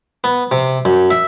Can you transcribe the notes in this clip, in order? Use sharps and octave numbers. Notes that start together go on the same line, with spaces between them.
B3
C3
F#2
E5